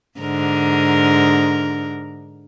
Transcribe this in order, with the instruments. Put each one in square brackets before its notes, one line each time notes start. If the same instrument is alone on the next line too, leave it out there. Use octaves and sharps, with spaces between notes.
[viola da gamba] G#2 D3 A#4